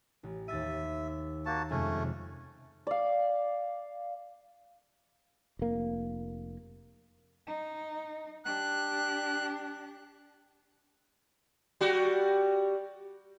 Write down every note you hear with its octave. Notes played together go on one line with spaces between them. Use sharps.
A1
D#2 E5 A6 D#7
A#3 F#4 A5
F2 C3 G#3 A3 C#4
D5 F5
F1 A#3
D#4
D4 G4 F#6
G3 F#4